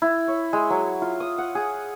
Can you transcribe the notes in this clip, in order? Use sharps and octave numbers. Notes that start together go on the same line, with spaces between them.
E4
C#5
G#3
F#3
F4
D#6
F#5
G#4